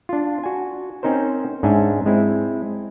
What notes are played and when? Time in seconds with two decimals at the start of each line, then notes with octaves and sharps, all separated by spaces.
0.09 D4 F4
0.44 F#4 G#5
1.03 C4 C#4 D#4 A#4 C5
1.63 G#2 C#4 D4 E5 G#5
2.06 G#3 C4 E4